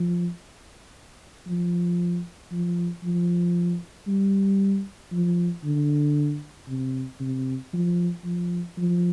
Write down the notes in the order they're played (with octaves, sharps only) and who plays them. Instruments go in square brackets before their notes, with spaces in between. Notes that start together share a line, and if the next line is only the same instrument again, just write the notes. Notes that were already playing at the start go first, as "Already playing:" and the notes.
Already playing: [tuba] F3
F3
F3
F3
G3
F3
D3
C3
C3
F3
F3
F3